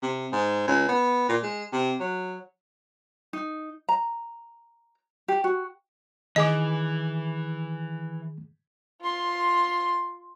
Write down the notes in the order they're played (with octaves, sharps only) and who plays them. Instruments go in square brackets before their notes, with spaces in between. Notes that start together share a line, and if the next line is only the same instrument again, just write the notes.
[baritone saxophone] C3
G#2
C#2
B3
A#2
G#3
C3
F#3
[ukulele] D#4
A#5
G4
F#4
[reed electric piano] D#3 G#4 D6 [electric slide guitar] E3 [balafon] D#5
[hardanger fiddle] F4 C6